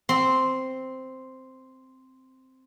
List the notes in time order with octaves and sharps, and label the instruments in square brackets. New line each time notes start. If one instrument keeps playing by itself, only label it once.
[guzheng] C4 C6